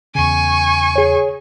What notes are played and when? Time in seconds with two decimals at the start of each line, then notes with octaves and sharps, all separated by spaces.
0.15 E2 C#3 G#5 C#6
0.96 G#4 C#5